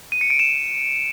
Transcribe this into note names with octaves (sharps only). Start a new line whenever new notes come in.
D#7
C#7
D7
E7